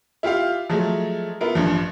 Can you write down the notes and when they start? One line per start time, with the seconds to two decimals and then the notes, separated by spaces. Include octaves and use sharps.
0.23 E4 F4 G4 F5
0.70 F3 F#3 G#3 A3
1.41 B3 E4 F4 A#4
1.55 A1 G2 F3